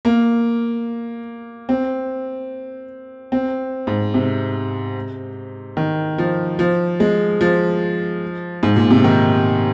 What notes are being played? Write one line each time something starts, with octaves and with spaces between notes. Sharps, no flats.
A#3
C4
C4
G#2
C3
D#3
F3
F3
G#3
F3
G#2
A#2
C3
D#3